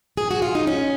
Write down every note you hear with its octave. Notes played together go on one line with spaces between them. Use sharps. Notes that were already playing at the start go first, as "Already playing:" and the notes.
G#4
F#4
F4
D#4
C#4